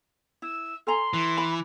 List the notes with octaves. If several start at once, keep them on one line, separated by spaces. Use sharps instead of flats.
E4 E6
A4 G#5 A#5 C6
E3
B5